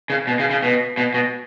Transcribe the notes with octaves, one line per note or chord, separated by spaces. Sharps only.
C#3
B2
C#3
C#3
B2
B2
B2